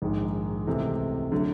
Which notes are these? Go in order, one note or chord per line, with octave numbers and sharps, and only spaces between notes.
A#1 G#2 D#3 G#3
C#2 C3 E3 A3
D3 F#3 A3